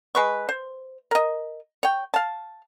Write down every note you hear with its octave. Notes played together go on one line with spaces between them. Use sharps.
G#3 B4 C#6
C5
A#4 D#5
C#5 G5
F5 A5